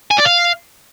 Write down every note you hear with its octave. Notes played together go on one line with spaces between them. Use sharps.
G#5
D5
F5